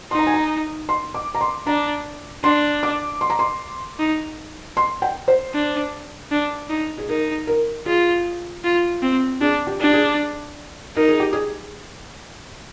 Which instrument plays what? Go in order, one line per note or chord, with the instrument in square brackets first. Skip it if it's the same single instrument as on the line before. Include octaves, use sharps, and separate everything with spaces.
[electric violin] D#4 [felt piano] C6
[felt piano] A#5
G#5
A#5
C6
D6
A#5
C6
[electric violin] D4 [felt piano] A#5
[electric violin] D4 [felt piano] C6
[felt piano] D6
C6
A#5
C6
[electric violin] D#4
[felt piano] C6
G5
C5
[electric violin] D4
D4
D#4
[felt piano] G#4
[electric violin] D#4 [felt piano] A#4
[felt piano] A#4
[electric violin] F4 [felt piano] G#4
[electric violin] F4
C4
[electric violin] D4 [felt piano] G#4
[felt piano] G4
[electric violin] D4 [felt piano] G4
[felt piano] G#4
[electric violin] D#4 [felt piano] A#4
[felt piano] G#4
G4
G#4